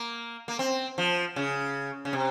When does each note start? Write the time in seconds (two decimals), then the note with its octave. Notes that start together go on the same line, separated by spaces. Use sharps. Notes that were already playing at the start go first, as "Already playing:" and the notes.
Already playing: A#3
0.48 A#3
0.59 C4
0.98 F3
1.36 C#3
2.05 C#3
2.13 C3